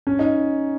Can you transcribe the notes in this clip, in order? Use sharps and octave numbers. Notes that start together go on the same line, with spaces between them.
C#4
D#4